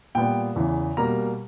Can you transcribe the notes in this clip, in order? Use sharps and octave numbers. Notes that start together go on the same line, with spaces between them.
A#2 G3 B3 G5
E2 C#3 E3
B2 G3 A#3 A#5